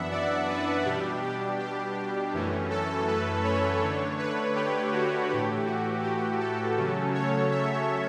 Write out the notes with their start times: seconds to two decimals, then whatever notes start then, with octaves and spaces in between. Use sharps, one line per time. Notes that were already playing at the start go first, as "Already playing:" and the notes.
Already playing: F#2 E3 B3 D4 E5 F#5
0.11 D5
0.49 B4
0.85 B2 G3 D4 G4
1.22 G4
1.59 G4
2.33 F#2 E3 A3 C#4
2.70 A4
3.08 B4
3.44 C#5
3.81 D3 A3 D4
4.18 B4
4.56 G4
4.92 F#4
5.30 A2 E3 A3 G4
5.66 F#4
6.04 G4
6.40 A4
6.77 C#3 F#3 A3 C#4
7.15 C#5
7.51 E5